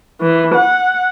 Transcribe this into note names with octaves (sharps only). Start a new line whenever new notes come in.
E3
F#5